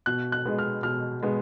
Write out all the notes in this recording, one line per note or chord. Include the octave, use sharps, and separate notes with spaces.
B2 F#6
F#6
G#3 B3
F6
B2 F6
G#3 B3